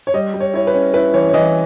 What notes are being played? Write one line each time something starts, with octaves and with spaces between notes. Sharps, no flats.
C#5
G3 D#5
G3
C#5
E4 C#5
B4
C#4
E4 B4
E3 C#5
C#5
E3 D#5